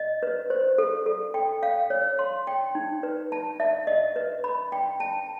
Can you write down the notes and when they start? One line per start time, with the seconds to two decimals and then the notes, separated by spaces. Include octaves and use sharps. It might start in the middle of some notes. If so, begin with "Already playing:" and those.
Already playing: D#5
0.23 B4
0.50 C5
0.78 A4
1.06 A4
1.34 G5
1.63 F5
1.90 C#5
2.19 C6
2.47 G5
2.75 D#4
3.03 B4
3.32 A5
3.60 E5
3.87 D#5
4.16 B4
4.44 B5
4.72 G5
5.00 A5